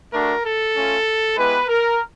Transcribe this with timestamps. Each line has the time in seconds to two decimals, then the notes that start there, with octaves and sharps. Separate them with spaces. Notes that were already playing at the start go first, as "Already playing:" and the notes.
0.13 A3 D4 F#4 A#4
0.44 A4
0.75 A3 C#4 F4
1.37 G#3 B3 E4 G4 B4
1.69 A#4